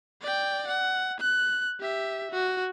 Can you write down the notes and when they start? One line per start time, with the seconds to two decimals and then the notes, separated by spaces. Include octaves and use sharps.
0.22 D5 G5
0.67 F#5
1.20 F#6
1.80 G4 E5
2.31 F#4